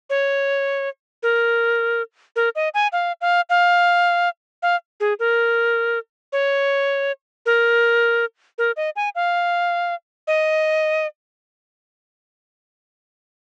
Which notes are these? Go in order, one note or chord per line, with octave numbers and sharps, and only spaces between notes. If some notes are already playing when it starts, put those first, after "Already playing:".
C#5
A#4
A#4
D#5
G#5
F5
F5
F5
F5
G#4
A#4
C#5
A#4
A#4
D#5
G#5
F5
D#5